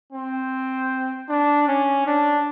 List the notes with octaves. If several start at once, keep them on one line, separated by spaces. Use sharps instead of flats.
C4
D4
C#4
D4